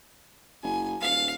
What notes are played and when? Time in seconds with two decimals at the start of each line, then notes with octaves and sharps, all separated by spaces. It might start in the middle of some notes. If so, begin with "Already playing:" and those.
0.63 F#1 G#5
1.01 D#1 F5